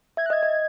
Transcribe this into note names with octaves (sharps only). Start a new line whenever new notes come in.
E5 G#6
F#6
D#5 G#6
D#5